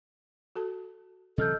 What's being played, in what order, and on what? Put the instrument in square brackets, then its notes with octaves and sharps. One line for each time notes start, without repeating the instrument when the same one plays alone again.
[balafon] F#4 A4 A5
[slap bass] C3 E3 F#3 [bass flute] A4 [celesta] D#5 F6 G6